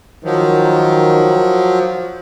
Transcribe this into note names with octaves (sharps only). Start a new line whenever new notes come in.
D#3 F3 F#3